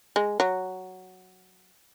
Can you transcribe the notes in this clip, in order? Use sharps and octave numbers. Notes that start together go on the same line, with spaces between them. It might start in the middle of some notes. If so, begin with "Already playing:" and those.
G#3
F#3